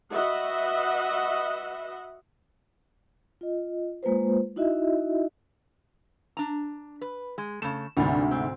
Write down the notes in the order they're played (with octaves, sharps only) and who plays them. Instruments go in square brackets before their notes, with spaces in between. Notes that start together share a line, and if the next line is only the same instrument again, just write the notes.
[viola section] F#4 B4 D#5 E5 F#5
[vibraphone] F4 D#5
G#3 A#3 F4 B4 C5
D#4 E4 F#4 D#5 E5
[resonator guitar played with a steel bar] D4 A#5
B4
G#3
[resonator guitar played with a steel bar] C#3 A3 [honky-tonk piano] E7
[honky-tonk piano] D2 G#2 C3 [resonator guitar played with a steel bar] G3 A#3 D4
[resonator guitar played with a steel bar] C4